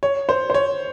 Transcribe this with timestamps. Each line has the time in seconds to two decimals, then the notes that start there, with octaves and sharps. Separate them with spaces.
0.03 C#5
0.29 C5
0.50 C5
0.54 C#5